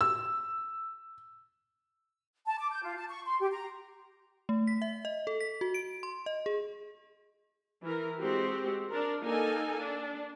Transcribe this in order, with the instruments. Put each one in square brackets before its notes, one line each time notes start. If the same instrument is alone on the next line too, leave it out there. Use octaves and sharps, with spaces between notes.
[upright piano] E6
[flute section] A5
D6
G6
F4
A5
C#6
C6
G4
A#5
[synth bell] A3
B6
E5
D#5
A4
B6
F#4
D7
C6
D#5
G#4
[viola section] E3 A#4
G#3 C4 F#4 G4
D4 A#4
A#3 D#4 A4 G#5
D4